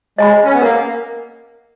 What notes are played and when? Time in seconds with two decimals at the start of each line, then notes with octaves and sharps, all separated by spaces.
0.18 G#3 D#5 G#5 B5
0.44 C#4
0.53 B3
0.62 A#3 A#4